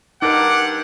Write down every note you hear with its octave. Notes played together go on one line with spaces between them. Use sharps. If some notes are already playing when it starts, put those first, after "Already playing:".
G2 D#4 A#4 F#5 D6